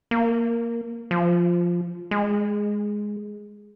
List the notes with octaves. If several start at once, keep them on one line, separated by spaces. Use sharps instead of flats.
A#3
F3
G#3